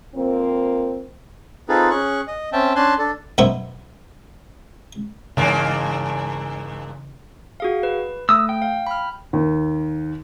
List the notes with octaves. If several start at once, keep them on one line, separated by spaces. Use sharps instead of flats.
F2 A#3 C4
C4 D#4 F4 G#4 A4 B4
C#4 G#4 C#6 F#6
D#5
C4 C#4 E5 G5 A5
C#4 D4 G#5 A5 C6 F#6
D4 A4
F#2 B2 B3 C5 E5
G2 C#3 E3 G#3 A#3
F#4 G#4 F5
B4
A3 D#6 E6
G5
F5
B5 F6
D#2